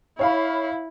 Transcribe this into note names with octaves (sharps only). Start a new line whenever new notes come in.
E4 C#5 F5 B5